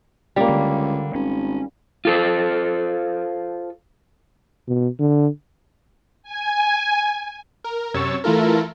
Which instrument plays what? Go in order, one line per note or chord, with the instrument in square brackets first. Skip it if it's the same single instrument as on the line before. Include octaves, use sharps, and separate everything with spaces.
[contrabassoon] C#2 [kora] G3 A#3
[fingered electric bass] D3
[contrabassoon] G#1 [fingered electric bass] C#4
[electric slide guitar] F4 A4 C5
[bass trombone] B2
D3
[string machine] G#5
[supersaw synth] A#4
F#2 C3 C#5 C#6 E6 A6
E3 A3 E4 F4 A4 A#4